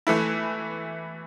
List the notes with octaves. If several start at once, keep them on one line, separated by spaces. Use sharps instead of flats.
E3 A3 E4